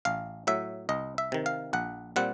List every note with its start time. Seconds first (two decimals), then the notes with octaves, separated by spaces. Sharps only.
0.05 A1 F5
0.47 A2 F#3 E5
0.89 C2 D#5
1.18 E5
1.32 C3 D#3
1.46 F5
1.73 A#1 F#5
2.16 A#2 G3 C4 F#5